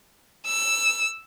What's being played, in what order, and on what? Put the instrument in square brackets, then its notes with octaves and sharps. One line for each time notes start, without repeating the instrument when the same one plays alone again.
[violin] E6